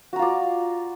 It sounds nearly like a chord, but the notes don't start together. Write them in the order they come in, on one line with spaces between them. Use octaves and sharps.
F#4 A#5 F4 D5